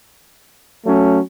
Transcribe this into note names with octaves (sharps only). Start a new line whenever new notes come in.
F#3 A3 C#4